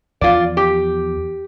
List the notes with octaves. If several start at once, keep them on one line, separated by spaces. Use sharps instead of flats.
E2 F3 F4 D5
G4